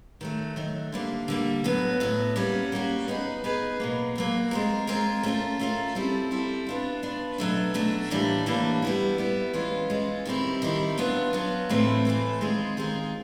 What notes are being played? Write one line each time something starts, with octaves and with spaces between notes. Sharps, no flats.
D#3 F#3 A3
D#3 F#3 A3
D3 G3 A#3
D3 G3 A#3
A2 F#3 B3
A2 F#3 B3
G3 A#3 C#4 F#4
G3 A#3 C#4 F#4
B3 D#4 G#4 B4
B3 D#4 G#4 B4
B2 F#3 A#3
B2 F#3 A#3
G#3 C4 F4 A#4
G#3 C4 F4 A#4
A3 C#4 F4 A#4
A3 C#4 F4 A#4
G3 C4 E4 A4
G3 C4 E4 A4
B3 D4 F4
B3 D4 F4
B2 F#3 A3 D4
B2 F#3 A3 D4
A2 E3 G3 A#3 D4
A2 E3 G3 A#3 D4
G3 B3 E4
G3 B3 E4
E3 G#3 C#4 F4
E3 G#3 C#4 F4
D#3 G3 C4 E4
D#3 G3 C4 E4
F#3 B3 D4 F4
F#3 B3 D4 F4
A2 E3 A3 C4
A2 E3 A3 C4
D#3 G#3 C4 F4 G#4
D#3 G#3 C4 F4 G#4